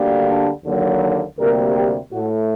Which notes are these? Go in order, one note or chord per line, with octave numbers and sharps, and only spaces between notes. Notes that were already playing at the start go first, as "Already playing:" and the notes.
Already playing: D2 D3 G3 A#3
D4
D#2 D3 F#3 A#3
D2 C3 G3 A#3 A#4
G4
A2 A3 F#4